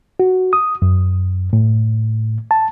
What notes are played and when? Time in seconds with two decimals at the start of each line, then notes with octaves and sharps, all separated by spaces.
0.20 F#4
0.53 D#6
0.82 F#2
1.53 A2
2.51 A5